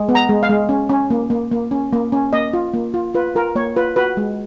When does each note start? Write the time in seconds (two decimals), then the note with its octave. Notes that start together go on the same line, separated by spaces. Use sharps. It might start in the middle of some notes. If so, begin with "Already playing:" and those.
Already playing: G#3
0.09 B3
0.15 A#5
0.29 G#3
0.43 F5
0.49 G#3
0.69 C#4
0.89 C#4
1.10 A#3
1.30 A#3
1.52 A#3
1.71 C#4
1.93 A#3
2.12 C#4
2.33 A#3 D#5
2.53 F4
2.74 A#3
2.94 F4
3.14 F4 B4
3.35 F4 A#4
3.55 A#3 C#5
3.76 F4 B4
3.96 F#4 B4
4.17 G#3